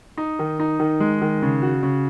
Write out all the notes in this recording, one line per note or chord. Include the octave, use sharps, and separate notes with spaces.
D#4
D#3
D#4
D#3
G#3
D#3
C#3
F#4
C#3